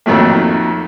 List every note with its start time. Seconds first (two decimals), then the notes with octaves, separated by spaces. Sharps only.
0.06 F2 D#3 F#3 A3 A#3